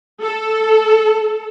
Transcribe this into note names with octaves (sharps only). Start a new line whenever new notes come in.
A4